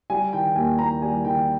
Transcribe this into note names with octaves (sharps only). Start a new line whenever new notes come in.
G3 G#5
D#3 G5
D#2 G#5
D#2 A#5
G3 G#5
D#3 G5